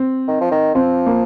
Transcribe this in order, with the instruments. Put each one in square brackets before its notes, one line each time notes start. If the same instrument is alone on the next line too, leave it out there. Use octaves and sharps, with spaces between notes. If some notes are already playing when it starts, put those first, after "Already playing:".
Already playing: [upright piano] C4
[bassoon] D#3
F3
D#3
[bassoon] F3 [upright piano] C4
[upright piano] A#3